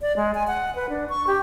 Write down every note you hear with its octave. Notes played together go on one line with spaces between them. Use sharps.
D5
G#3
G#5
F#5
B4
D4
C#6
G4